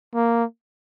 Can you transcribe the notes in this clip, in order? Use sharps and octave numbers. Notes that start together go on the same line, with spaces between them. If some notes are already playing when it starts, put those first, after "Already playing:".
A#3